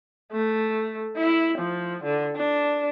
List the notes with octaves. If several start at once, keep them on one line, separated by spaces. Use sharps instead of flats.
A3
E4
F3
D3
D4